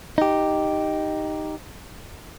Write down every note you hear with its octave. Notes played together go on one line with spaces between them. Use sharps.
D#4 G4